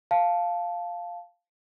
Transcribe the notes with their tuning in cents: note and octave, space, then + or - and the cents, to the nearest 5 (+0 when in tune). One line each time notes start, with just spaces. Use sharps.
F5 +0 A5 -10